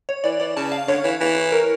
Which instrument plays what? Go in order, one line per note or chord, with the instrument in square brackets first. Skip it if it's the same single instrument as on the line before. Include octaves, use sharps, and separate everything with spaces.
[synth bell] C#5
[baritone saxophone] E3 [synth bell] D5
[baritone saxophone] E3 [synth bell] D5
[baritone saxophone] C#3 [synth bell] A5
[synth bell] F5
[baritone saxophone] D3 [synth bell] C#5
[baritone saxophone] E3
E3
[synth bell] A#4